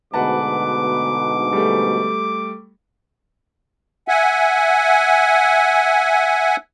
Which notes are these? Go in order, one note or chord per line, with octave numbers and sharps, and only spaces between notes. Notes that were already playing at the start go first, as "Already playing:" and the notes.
D2 G#2 B2 B4 F#5 A5 D6
G3 A3
E5 F#5 G#5